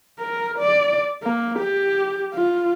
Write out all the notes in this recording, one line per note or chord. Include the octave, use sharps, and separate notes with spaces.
A#4
D5
A#3
G4
F4